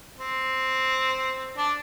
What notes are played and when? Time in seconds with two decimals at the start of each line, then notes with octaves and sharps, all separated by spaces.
0.18 C4
1.57 D4